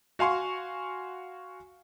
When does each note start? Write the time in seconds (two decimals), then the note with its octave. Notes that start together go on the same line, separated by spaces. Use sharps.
0.19 F#4 F5 G#5 C6 C#6